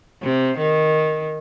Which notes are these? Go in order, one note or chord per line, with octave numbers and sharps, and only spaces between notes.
C3
D#3